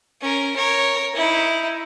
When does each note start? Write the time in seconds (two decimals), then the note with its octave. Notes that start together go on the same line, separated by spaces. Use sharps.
0.21 C#4 A#4
0.56 A#4 C#5
1.15 D#4 E4